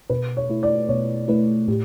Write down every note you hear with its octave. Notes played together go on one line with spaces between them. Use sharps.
B2 B4
C#5
A3 E4
D5
B2 C#5
A3 E4 B4
A2 G4